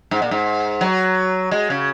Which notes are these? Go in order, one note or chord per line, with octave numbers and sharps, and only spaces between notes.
G#2
A#2
G#2
F#3
G#3
C#3